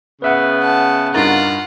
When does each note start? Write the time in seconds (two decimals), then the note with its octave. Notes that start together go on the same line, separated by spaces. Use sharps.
0.22 C#3 B3 B4 E5 F#5
0.62 A5
1.14 G2 D#4 F4 A#4 F#5 A#5 C#6 A6